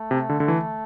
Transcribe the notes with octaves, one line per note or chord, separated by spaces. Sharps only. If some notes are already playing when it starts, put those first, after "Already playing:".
Already playing: A3
C3
D3
D3
E3